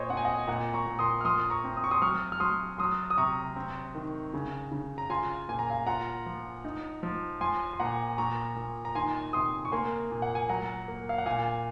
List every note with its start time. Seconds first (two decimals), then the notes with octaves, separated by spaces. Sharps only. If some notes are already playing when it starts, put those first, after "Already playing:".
Already playing: A#2 C5 C#5 D#5
0.09 C4 F#5
0.17 G#5
0.25 D#5 F#5
0.47 A#2 F#5 A#5
0.74 A#5 C#6
0.86 A#2
0.99 C6 D#6
1.21 F6
1.24 F3 C6 D#6
1.39 D#6
1.50 A#5 C#6
1.64 C4
1.77 D#6
1.84 C#6
1.91 C6 D#6
2.02 F#3 C#6 F6
2.32 F6
2.40 F#3 C6 D#6
2.78 F#3 C6 D#6
3.10 D#6
3.17 C3 A#5 C#6
3.56 C4
3.95 D#3
4.34 C#3
4.72 C#3
4.98 A#5
5.10 F4 G#5 C6
5.49 A#2 G#5
5.59 A#5
5.70 F5 G#5
5.87 F4 F#5 A#5
6.26 F3
6.65 D#4
7.03 F3
7.41 F3 G#5 C6
7.74 C6
7.80 A#2 F#5 A#5
8.18 A#2 A#5 C#6
8.56 A#2
8.85 A#5
8.95 D#3 G#5 C6
9.33 C3 C6 D#6
9.65 C#6
9.72 A#3 G#5 C6
10.11 A#2
10.22 F#5
10.35 G#5
10.49 F#3 F#5 A#5
10.88 A#3
11.09 F5
11.18 F#5
11.26 A#2 F5 G#5